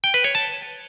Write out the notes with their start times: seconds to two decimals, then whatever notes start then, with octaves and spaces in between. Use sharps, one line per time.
0.04 G5
0.14 B4
0.24 C#5
0.35 A5